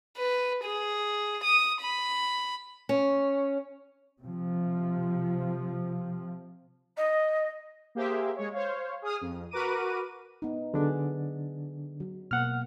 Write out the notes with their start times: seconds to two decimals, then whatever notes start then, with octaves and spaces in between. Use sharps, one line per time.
0.17 B4
0.64 G#4
1.44 D#6
1.81 B5
2.89 C#4
4.22 C3 F3
6.97 D#5
7.95 A#3 G4 G#4 C5 E5
8.36 G#3 C#5
8.53 C5 C#5 F5
9.02 G#4 D#6 F6
9.21 F2
9.51 F#4 A#4 B4 A#5 D6 D#7
10.42 B3 D#4
10.74 D3 F#3 B3 D4 G#4
12.00 F#3
12.31 B2 A#3 F#5 F6